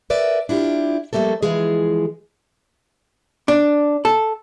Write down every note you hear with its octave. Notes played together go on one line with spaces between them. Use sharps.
A#4 B4 D5 E5
D4 E4 F4 G4
F3 G3 A3 A#3 A4
E3 F3 G#3 G#4
D4
A4